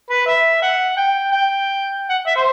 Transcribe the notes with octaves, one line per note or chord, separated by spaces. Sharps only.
B4
E5
F#5
G5
G5
F#5
E5
C5